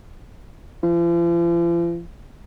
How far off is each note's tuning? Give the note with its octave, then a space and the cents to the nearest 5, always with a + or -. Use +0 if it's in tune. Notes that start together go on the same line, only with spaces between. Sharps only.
F3 -45